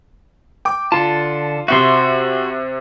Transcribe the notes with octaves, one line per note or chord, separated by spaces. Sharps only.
G5 D6
D3 F4 A5
C3 C4 F#4 E5 C6